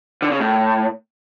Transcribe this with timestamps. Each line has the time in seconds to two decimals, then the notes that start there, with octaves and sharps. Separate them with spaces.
0.22 D3
0.31 C#3
0.40 A2